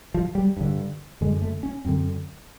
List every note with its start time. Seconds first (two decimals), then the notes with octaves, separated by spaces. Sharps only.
0.14 F3
0.35 G3
0.57 G2 D3
1.21 F#2 D3 G#3
1.42 A3
1.63 C#4
1.85 F#2 D3 C4